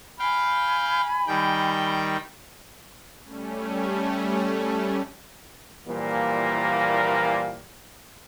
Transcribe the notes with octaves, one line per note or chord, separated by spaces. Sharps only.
F5 G5 G#5 B5
D#3 G3 G5
G3 A3 C#4
A#2 E3 F3 G3 A#3